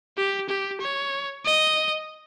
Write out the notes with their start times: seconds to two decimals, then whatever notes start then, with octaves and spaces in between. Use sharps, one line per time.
0.17 G4
0.49 G4
0.81 C#5
1.45 D#5